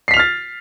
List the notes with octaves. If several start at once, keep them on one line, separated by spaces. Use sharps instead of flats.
F6 A6 B6 C7 F7